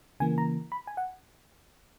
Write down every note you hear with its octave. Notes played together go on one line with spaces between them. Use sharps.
C#3 E3 A#3 G#5
A#5
B5
G#5
F#5